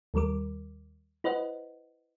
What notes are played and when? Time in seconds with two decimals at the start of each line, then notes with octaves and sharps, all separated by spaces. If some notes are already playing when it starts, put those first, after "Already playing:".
0.14 D#2 D#3 G3 A#4 D6
1.24 E4 B4 C5 D#5 F#5